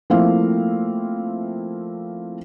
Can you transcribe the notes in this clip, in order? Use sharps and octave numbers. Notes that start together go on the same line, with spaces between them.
F3 A3 A#3 C4 E4 F5